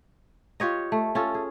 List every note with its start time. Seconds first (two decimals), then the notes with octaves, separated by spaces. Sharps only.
0.60 F4 G4 C#5 D#5
0.92 A3
1.15 C#4 F4 A4
1.35 G#4